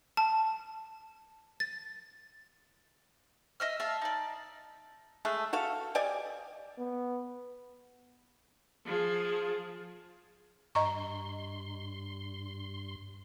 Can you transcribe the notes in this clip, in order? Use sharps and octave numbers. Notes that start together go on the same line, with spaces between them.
A5
A6
D#5 E5 F6
E5 F5 A5
D#4 D5
G#3 A3 G#4
F#4 A4 F5
G4 D5 D#5 G#5
B3
F3 G#4
G2 D#5 A#5 C6 C#6